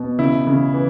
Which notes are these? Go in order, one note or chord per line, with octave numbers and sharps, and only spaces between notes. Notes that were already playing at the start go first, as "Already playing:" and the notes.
Already playing: B2
C#3 E4
C#3
E3